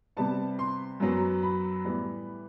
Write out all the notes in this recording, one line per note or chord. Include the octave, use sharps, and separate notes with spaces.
C3 G3 B3 A5
C6
F#2 F#3 B3
B5
A2 E3 G3 B3